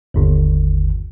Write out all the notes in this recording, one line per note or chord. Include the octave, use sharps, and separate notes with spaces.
G1 D#2